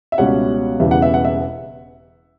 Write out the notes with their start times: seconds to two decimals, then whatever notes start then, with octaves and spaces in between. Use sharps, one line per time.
0.12 E5
0.18 C#2 B2 G3 C#4 F#5
0.80 E1 E2 C#3 G3 B3 E5
0.91 F#5
1.02 E5
1.14 F#5
1.25 E5